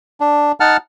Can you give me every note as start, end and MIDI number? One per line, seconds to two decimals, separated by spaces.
0.21 0.52 62
0.60 0.77 63
0.60 0.77 78
0.60 0.77 81
0.60 0.77 89